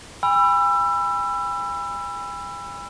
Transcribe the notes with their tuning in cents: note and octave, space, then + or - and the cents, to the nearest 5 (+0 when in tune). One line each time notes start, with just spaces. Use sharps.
G#5 -40 B5 +0 E6 +25